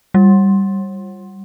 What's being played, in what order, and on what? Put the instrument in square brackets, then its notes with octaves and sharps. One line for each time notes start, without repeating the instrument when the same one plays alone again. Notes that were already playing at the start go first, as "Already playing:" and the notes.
[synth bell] G3